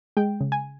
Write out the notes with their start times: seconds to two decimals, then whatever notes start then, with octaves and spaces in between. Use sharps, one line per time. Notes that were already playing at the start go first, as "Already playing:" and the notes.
0.17 G#3 G5
0.41 C#3
0.52 G#5